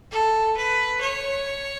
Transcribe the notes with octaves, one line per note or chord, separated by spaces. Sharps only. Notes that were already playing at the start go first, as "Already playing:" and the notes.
A4
B4
C#5